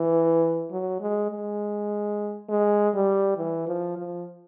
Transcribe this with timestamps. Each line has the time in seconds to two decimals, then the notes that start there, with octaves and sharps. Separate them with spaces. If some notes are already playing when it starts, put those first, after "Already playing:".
Already playing: E3
0.71 F#3
1.00 G#3
1.30 G#3
2.49 G#3
2.94 G3
3.37 E3
3.67 F3
3.97 F3